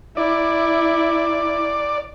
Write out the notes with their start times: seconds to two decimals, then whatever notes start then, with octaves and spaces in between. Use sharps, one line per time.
0.17 E4 D5